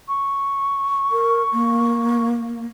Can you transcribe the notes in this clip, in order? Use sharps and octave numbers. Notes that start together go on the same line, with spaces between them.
C#6
A#4
A#3